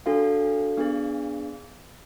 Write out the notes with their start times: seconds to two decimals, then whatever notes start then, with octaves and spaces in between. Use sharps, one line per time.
0.06 D4 F#4 A4 F5
0.77 B3 D4 G#4